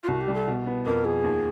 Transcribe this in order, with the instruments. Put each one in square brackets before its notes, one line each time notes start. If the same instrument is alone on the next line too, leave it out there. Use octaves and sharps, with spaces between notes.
[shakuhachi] F4
[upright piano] C2 [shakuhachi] F#4
[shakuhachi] G4
[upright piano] G3
[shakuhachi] A4
[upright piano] B2
B3
[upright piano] F2 [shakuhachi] A#4
[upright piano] F3 [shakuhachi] G#4
[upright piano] D#2